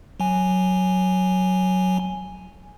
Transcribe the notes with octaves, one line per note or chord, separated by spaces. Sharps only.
F#3 G#5